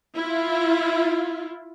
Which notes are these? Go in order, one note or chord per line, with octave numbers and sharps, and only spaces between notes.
E4 F4